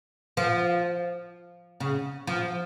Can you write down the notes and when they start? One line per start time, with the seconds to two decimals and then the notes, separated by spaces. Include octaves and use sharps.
0.37 F3
1.80 C#3
2.27 F3